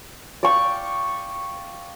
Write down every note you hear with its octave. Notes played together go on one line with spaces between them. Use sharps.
D5 F5 G5 C#6